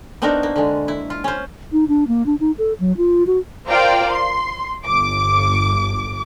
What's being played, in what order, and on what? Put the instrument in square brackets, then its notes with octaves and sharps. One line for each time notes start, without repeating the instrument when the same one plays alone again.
[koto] B3 C4 D4 D#4 F#4 A#4
A#3
D3 G#3
E4
F4
C#4 C5
[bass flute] D#4
D4
A#3
D4
D#4
A4
F#3
F4
F#4
[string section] F4 A#4 C5 D5 F5 G5
C6
G1 D6